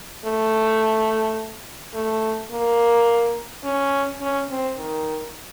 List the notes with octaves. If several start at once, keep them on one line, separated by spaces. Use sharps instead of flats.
A3
A3
A#3
C#4
C#4
C4
D#3